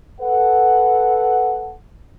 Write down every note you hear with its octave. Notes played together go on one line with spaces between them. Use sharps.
A4 B4 F#5